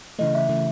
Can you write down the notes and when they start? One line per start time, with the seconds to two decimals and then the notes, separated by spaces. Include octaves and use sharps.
0.19 C#3 E3 A3 D#5
0.34 E5
0.49 C#3 E3 A3